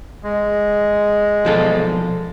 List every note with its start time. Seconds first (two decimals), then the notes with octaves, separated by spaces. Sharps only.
0.23 G#3
1.45 B1 F3 A4